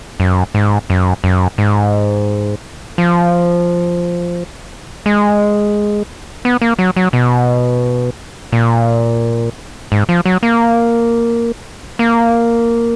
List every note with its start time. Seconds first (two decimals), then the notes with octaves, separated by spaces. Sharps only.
0.20 F#2
0.55 G#2
0.90 F#2
1.24 F#2
1.58 G#2
2.98 F3
5.06 G#3
6.45 B3
6.62 A#3
6.79 F#3
6.96 F#3
7.13 B2
8.52 A#2
9.92 G#2
10.09 F3
10.26 F#3
10.43 A#3
11.99 A#3